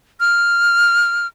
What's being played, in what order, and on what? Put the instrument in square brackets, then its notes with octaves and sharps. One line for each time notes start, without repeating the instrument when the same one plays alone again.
[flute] F6